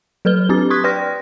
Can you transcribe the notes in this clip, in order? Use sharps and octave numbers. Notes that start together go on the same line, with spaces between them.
F#3 A4 B4 F6 G7
C4 D4 G4 D6 A6
C6 C#6 D#6 F#6 G#6 B6
B4 D5 G5 C6 F6 A#6